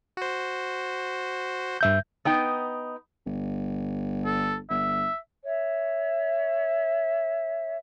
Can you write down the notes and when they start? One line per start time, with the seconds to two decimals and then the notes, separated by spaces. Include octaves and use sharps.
0.17 F#4 C5
1.81 G2 E5 G6
2.25 B3 D#4 G5
3.26 G1
4.25 A4
4.70 G1 E5
5.45 C#5 E5